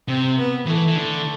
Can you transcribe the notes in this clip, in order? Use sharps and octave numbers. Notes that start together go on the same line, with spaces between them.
C3 C4
B3
E3 A3
E3
D3